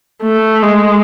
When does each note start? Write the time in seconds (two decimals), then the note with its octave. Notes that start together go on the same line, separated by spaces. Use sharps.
0.23 A3
0.62 G#3